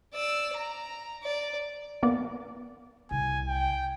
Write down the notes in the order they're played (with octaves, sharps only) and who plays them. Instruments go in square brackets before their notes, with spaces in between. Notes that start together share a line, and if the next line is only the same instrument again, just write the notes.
[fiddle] D5 E6
A#5
D5
[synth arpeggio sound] A#3 B3 D5
[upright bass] C2 [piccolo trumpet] G#5
[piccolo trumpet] G5